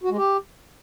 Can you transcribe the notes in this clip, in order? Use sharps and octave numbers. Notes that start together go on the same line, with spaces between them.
F#4
G#3
G4